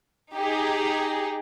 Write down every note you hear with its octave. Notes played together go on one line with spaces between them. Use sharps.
D#4 G4 G#4